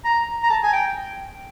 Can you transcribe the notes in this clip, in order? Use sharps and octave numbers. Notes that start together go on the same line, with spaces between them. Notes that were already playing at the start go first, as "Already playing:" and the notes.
A#5
A#5
A5
G#5
G5